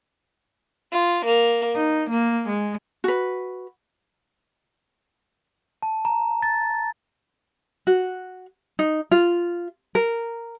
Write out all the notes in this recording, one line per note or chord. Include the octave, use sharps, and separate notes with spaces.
F4
A#3
D#4
A#3
G#3
F#4 B4
A5
A#5
A6
F#4
D#4
F4
A#4